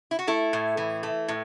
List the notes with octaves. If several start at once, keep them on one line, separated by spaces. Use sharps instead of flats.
E4
F#4
A3 E4 A4
A2
E3
A3
A2